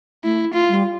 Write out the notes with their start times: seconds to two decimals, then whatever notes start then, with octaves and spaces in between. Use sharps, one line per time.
0.24 A3 E4
0.53 F4
0.68 G3